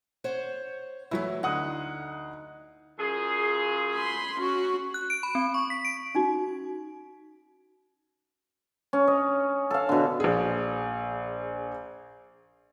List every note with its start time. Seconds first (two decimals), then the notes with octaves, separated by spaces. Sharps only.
0.24 C5 C#5 F#5
1.11 E3 F#3 A3 E4
1.43 D2 D#4 F#5 D#6
2.99 F#2 F4 G#4
3.94 B5 C6
4.40 C#4 F#4
4.94 F#6
5.10 D7
5.23 B5
5.35 C4
5.54 C#6
5.70 B6
5.85 D7
6.15 C#4 D#4 F#4
8.93 C#4
9.07 D#5
9.71 A4 F5
9.89 B2 D3
10.20 A#1 G#4